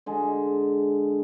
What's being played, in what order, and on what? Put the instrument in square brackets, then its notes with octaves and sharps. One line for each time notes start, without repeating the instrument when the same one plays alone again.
[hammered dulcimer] D3 G#3